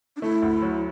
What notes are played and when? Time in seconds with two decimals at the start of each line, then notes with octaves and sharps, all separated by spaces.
0.16 D4
0.22 A3 E4
0.42 D2
0.62 F#3